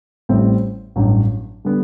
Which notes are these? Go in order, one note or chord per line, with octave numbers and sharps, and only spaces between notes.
A1 A2 G3 C4
A1 G2 F#3
D3 G3 B3